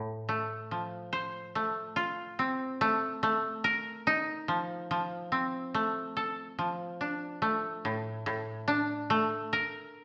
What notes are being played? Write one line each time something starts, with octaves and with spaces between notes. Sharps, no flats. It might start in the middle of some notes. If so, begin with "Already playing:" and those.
Already playing: A2
A3
F3
C5
A3
F4
C4
A3
A3
A#4
D#4
F3
F3
C4
A3
A4
F3
D4
A3
A2
A2
D4
A3
A#4